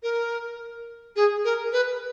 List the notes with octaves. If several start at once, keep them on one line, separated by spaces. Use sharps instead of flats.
A#4
G#4
A#4
B4